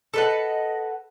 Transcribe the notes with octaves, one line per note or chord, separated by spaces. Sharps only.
A4 B4 D#5 F#5